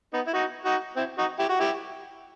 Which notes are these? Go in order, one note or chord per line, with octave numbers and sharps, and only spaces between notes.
B3 D#4
E4
D#4 F#4
D#4 F#4
C4 E4
D#4 F#4
E4 G4
F#4
E4 G4